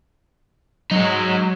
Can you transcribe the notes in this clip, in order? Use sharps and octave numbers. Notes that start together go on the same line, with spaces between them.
F#3 G#3 D#4